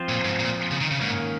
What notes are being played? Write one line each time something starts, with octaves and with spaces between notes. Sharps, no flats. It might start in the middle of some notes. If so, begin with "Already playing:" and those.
Already playing: F3 C4 F4 C5
A#2
G#2
A#2
C#3
D#3
C#3
G#2 D#3 A#3 C#4